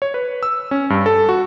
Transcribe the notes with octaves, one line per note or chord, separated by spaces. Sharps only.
C#5
B4
E6
C#4
G2
A4
F#4